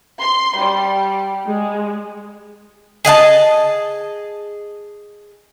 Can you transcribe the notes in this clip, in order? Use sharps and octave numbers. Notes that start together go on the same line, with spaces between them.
C6
G3
G#3
G#4 D#5 F#5 A5